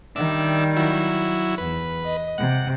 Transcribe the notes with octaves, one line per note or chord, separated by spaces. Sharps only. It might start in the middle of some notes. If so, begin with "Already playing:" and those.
D#3 G3 D4 E5
F#3 E4
E2 B4
D#5
C3 F#5